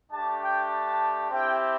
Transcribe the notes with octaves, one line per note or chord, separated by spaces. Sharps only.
A3 D4 G4 A5
G5
A5
C4 E4 G4 G5